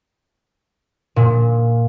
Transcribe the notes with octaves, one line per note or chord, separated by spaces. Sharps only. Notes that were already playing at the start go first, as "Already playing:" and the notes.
A#2